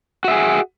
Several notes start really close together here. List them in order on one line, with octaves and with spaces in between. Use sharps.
F#4 E5 G#4